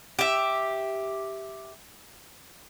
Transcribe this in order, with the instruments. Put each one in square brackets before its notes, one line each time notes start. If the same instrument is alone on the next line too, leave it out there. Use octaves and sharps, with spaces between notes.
[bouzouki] G4 E5